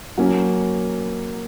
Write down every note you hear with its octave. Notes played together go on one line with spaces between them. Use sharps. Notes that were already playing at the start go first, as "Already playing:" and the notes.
F#3 A#3 C#4